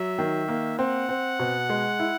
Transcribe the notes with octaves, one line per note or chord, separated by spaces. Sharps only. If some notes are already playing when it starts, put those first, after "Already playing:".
Already playing: F#3 E5
D#3
A#3
C4 F#5
C4
B2
G#3
E4